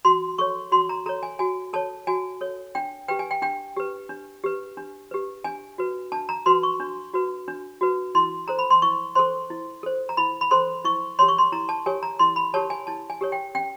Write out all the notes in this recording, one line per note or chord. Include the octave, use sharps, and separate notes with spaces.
F#4 C6
A4 C#5 C#6
F#4 C6
A#5
A4 C#5 A#5
G#5
F#4 G#5
A4 C#5 A5
F#4 G#5
A4 C#5
D4 G5
G4 B4 G5
G#5
G5
D4 G5
G4 B4
D4
G4 B4
D4
G4 B4
D4 G#5
F#4 B4
D4 A5
A#5
F#4 B4 C6
C#6
D4
F#4 B4
D4
F#4 B4
E4 C6
A4 C5 A#5
B5
C6
E4 C#6
A4 C5 C6
E4
A4 C5
A#5
E4 B5
B5
A4 C5 C6
E4 C#6
G4 A#4 C#5 C6
C#6
C6
E4 A#5
A5
G4 A#4 C#5 G#5
A#5
E4 C6
B5
G4 A#4 C#5 A5
G#5
E4 A5
G#5
G4 A#4 C#5
G5
C#4 G5